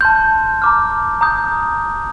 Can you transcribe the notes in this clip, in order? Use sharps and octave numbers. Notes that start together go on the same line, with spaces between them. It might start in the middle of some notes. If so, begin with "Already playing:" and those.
A5 C6 F6 G6
A#5 D6 F6
A#5 D#6 G6